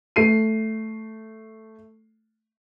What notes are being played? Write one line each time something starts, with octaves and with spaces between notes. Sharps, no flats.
A3 C7 D#7